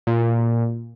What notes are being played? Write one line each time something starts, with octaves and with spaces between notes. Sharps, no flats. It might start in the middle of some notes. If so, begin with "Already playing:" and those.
A#2